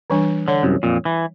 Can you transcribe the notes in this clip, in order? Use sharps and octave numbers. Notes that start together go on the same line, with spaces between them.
E3 G3 D4
D3 C#5
C2 F#2
F2 A#2
E3